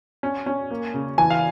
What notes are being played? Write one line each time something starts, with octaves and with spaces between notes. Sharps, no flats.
C#4
C#4
A#3
C#3
E3 G#5
F5